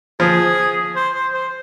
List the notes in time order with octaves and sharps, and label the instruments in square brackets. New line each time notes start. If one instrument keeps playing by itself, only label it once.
[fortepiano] F3 [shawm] G#4
[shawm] C5
C5
C5